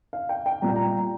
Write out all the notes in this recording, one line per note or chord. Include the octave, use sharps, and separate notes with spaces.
F5
G5
G5
A#2 G3 A#5
G5
A#5